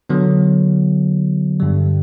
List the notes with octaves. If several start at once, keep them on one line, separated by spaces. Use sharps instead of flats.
D3 F#3 B3
G2 D3 G3